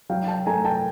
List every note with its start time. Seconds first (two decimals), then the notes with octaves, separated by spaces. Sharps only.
0.09 F#3 F5 G5
0.28 G5 A5
0.46 A3 G#5 A#5
0.64 G5 A5